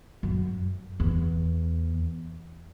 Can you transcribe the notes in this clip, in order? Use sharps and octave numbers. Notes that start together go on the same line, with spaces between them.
F#2
E2